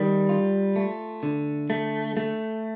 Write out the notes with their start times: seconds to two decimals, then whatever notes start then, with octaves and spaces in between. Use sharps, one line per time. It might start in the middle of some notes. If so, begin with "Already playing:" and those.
Already playing: D#3 G3
0.29 F4
0.76 A3
1.23 D3
1.70 A3
2.17 A3